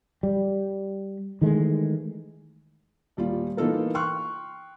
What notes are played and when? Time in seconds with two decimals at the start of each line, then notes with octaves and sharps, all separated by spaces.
0.23 G3
1.41 D#3 E3 G#3 A3
3.17 D#1 G3 F4
3.57 E3 A#3 D#4 F4 A4 A#4
3.95 G5 C6 C#6 F6 F#6